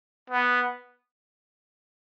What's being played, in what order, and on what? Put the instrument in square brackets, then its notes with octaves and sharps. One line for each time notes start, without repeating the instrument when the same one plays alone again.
[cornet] B3